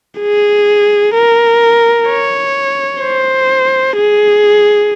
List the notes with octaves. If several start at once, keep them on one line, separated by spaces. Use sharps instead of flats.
G#4
A#4
C#5
C5
G#4